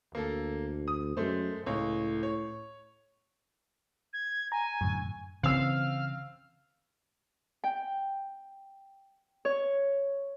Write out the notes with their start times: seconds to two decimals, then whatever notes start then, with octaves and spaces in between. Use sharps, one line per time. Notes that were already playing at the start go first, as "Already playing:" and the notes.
0.15 D2 A#3 A4
0.88 D#6
1.17 F#2 G#3 A3 C5
1.66 C#2 A2 C#5
2.23 C#5
4.13 G#6
4.52 G#5 A#5
4.81 F#2 A2 D3
5.43 C#3 E3 C4 F5 E6
7.64 G5
9.45 C#5